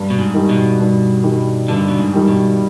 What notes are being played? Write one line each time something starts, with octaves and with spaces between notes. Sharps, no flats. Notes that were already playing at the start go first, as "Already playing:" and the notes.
Already playing: G2
B2
G#2
D#3 G3
B2
G2
D#3 G3
G2 D3
B2
G#2
D#3 G3
B2